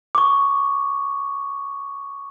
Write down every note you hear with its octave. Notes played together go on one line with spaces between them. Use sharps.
C#6 D6